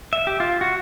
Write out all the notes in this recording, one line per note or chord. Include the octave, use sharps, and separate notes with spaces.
E5
G4
F4
F#4